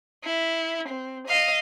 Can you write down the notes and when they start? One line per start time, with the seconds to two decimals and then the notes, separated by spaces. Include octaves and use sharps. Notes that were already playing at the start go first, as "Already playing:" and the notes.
0.24 E4
0.89 C4
1.28 D#5 F5